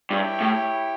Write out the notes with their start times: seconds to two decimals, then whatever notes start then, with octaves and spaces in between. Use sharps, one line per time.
0.11 G2 E4 G4 C#5 G5
0.41 A2